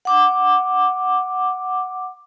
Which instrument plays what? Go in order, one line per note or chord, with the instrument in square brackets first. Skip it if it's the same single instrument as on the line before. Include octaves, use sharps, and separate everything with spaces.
[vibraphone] F#5 D6